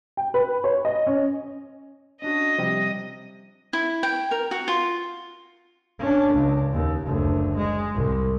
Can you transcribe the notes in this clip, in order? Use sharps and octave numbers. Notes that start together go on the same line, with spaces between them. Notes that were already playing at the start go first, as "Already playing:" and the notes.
G5
B4
C#5
D#5
C#4
C#4 D4 F#4 D#5
C3 F3 G3
E4
G5
A#4
F#4
F4
C#4 D4
C#2
D#2
F#1 D2
G#3
C2